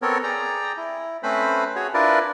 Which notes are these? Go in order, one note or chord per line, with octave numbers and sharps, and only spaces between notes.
B3 C4 A4 A#4 C#5
G#4 D5 G5 A#5
E4
A3 C4 C#4 B4 C5 B5
F#4 G#4 C#5
D4 E4 F4 A#4 B4 D5